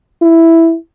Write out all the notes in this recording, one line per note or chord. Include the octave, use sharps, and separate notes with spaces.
E4